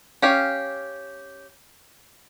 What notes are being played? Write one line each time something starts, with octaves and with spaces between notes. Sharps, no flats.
C#4 G4 F5